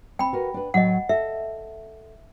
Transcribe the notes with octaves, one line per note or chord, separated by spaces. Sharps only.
C4 G5 B5
F#4 A#4 B4
D4 B4
A2 F#3 A3 D#5 F#5
A4 E5